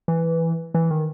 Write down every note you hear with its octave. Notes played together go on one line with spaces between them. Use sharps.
E3
E3
D#3